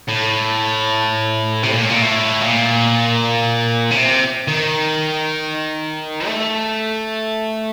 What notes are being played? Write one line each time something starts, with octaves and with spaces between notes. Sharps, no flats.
A2
C3
A#2
A2
A#2
A2
A#2
C#3
C3
D#3
A3